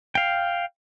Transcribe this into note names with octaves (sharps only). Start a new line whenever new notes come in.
F5 G5